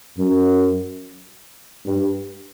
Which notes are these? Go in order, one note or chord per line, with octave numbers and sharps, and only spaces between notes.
F#2
G2